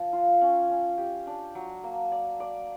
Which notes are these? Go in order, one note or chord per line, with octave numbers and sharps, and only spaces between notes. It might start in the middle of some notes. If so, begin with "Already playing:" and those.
Already playing: F3
F4
C#4
C#4
G4
D4
F#3
A#3
D5
D5